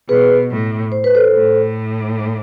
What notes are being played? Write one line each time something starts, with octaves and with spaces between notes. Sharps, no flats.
B2 G#4 B4
A2
C5
B4
A4 C5
A2